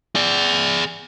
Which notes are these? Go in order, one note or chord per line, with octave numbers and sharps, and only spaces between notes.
G#4 D5